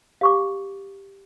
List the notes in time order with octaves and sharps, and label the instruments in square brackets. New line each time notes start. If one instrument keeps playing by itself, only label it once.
[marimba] G4 [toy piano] F5 C#6 D6